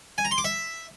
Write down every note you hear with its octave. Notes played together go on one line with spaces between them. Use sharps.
G#5
A#5
C6
D6
E5